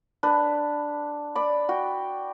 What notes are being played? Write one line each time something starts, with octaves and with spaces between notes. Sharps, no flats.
D4 B4
D5 B5
F#4 G5